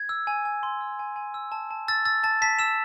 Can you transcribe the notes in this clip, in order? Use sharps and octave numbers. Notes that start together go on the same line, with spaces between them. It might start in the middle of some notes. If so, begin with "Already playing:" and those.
Already playing: G#6
E6
G#5
G#5
C6
E6
G#5
G#5
E6
A5
A5
E6 A6
E6 A6
A5 A6
A5 B6
E6 E7